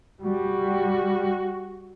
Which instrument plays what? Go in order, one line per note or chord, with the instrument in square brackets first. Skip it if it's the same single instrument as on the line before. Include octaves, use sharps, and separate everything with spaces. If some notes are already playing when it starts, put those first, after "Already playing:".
[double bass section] G3 [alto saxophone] F#4